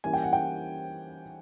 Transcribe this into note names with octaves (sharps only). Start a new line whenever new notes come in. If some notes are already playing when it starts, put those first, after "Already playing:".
E3 G3 A#3 C#4 G#5
G5
F#5
G5